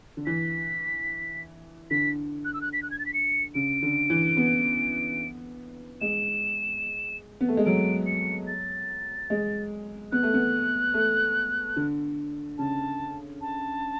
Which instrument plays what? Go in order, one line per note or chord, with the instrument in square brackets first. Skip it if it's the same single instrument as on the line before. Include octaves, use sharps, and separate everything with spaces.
[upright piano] D3
[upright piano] E3 [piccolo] B6
[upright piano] D3 [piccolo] B6
[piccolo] F#6
E6
F#6
B6
F#6
G#6
A6
B6
C#7
[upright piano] C#3 [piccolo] D7
[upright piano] D3
E3
B3
[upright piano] G#3 [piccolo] E7
[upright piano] B3
A3
G#3
[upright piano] F#3 [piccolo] D7
[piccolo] C#7
A6
[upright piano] G#3
[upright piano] B3 [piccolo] F#6
[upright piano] A3
B3
A3
D3
[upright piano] C#3 [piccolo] A5
[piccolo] A5